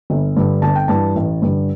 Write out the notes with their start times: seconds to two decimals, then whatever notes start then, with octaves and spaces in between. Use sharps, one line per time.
0.10 G1
0.36 G2 D3
0.62 G1 A5
0.75 G5
0.88 G2 E3 A5
1.16 A1
1.42 G2 D3